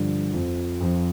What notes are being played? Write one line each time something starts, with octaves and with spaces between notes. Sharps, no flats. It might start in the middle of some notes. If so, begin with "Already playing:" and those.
Already playing: G2 D3 F3
F2 F3
F2 F3